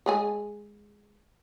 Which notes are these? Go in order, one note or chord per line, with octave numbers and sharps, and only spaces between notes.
G#3 G#4 G#5